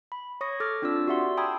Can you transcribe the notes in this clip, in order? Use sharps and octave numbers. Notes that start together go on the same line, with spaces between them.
B5
C#5 C#6 D#6 A#6
A4 D6 F6 A6
C4 D4 F4 D5 E6
F#4 G4 D5 E5 F#5 C6
G5 A5 B5 D#6 E6 G#6